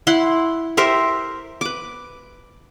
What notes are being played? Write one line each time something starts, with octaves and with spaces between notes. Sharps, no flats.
E4 F#5 C6
G4 A#4 C5 E5
B4 D6